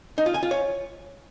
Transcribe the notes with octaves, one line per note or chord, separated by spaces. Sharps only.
D#4
F4
G#5
F4
C#5